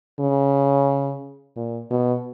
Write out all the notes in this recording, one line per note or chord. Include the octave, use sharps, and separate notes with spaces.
C#3
A#2
B2